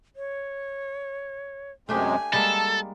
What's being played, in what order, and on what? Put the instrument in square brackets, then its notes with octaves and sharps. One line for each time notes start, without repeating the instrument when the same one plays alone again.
[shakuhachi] C#5
[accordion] F#2 C3 G#3 [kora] A3 D4 G4 [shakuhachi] G#5
[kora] G3 G#3 A#3 [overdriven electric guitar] A4 [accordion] A5